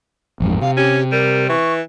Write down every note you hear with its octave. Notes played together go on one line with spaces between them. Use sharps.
A1 F2 G#2
C3 F5
C#4 G4
G3 A#4
E3 C#6